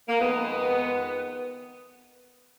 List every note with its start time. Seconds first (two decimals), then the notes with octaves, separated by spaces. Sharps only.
0.08 A#3
0.19 F2 D#3 G#3 B3